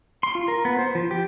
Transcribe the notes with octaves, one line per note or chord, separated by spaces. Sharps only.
C6
F4
A#4
B3
C5
F3
G4